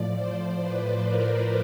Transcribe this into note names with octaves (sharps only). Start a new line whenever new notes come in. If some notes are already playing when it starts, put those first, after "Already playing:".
Already playing: A2 F3 D5
C5
B4
A#4